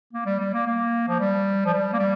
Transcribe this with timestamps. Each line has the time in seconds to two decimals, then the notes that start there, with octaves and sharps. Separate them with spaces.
0.13 A#3
0.26 G3
0.40 G3
0.53 A#3
0.66 A#3
1.09 F3
1.20 G3
1.66 F3
1.74 G3
1.93 A#3
1.99 G3